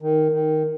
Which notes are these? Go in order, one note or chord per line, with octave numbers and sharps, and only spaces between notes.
D#3
D#3